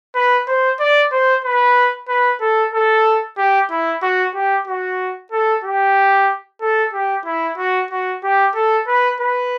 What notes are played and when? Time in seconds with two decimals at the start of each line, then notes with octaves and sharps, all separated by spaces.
0.15 B4
0.48 C5
0.80 D5
1.12 C5
1.44 B4
2.09 B4
2.41 A4
2.74 A4
3.38 G4
3.71 E4
4.02 F#4
4.35 G4
4.67 F#4
5.32 A4
5.64 G4
6.61 A4
6.93 G4
7.26 E4
7.58 F#4
7.91 F#4
8.24 G4
8.55 A4
8.87 B4
9.20 B4